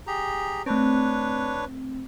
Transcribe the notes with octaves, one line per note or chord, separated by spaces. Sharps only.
G4 G#4 A#5
A3 C4 D4 B4 C#5